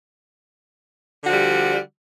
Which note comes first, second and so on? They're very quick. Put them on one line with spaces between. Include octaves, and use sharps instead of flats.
D3 F#4 F3 G3